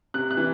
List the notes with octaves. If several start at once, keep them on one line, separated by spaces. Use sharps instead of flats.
C3 F#6
F#6
E3